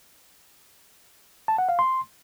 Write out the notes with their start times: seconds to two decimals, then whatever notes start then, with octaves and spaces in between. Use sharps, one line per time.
1.48 A5
1.58 F#5
1.69 F5
1.79 C6